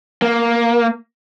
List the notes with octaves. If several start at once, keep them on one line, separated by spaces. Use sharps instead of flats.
A#3